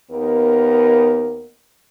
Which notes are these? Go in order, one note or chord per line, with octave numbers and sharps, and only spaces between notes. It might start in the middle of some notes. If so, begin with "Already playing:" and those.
D#2 B3 A#4